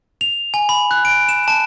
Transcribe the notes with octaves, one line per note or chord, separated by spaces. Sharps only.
F7
G#5
B5
F#6
D7
E7
A5